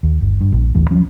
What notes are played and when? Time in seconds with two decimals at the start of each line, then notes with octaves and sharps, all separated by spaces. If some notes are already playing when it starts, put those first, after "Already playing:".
0.03 D#2
0.21 G1
0.41 G2
0.52 A#1
0.75 A1 D#2 E3 A3
0.91 F3 F#3 C#4